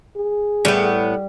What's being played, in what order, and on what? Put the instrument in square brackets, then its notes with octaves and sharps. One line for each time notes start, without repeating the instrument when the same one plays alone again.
[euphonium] G#4
[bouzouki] A2 B3 [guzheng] G3